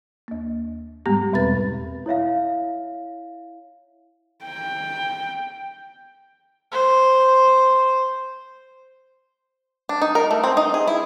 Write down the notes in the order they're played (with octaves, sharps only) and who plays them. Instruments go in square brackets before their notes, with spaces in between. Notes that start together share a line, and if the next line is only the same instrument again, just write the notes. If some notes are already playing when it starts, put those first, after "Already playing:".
[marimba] D#2 A#3
G#2 G3 G#3 B3 G4
E2 B2 C4 B4 A6
[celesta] E4 C#5 E5 F5
[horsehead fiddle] G5
[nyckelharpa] C5
[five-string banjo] D4
D#4
A#4
A3
C4
D#4
G#4
E4